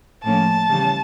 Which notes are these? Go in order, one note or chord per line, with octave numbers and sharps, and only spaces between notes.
A2 F3 A#3 C#4 A5
C#3 E3 G3 C#4